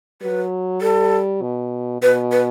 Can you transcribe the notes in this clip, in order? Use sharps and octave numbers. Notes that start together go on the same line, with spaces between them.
F#3 B4
G3 A4
B2
B2 B4
B4